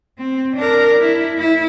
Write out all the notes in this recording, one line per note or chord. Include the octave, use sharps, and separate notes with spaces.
C4
D4 A#4
E4
E4